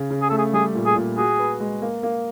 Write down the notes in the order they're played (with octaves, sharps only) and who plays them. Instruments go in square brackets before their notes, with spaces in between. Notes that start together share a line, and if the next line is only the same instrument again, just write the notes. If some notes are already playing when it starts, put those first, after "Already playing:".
Already playing: [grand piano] C#3
C#3
[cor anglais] G#4
[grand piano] A3 [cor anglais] A4
[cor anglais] G#4
[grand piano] G3 [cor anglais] G#4
[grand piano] A#2
[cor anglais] G#4
[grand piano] A#2
[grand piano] F#4 [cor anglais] G#4
[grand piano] B4
G#3
A#3
A#3